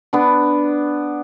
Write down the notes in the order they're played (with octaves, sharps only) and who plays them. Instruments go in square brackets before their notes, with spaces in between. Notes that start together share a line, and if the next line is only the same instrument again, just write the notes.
[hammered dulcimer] B3 D4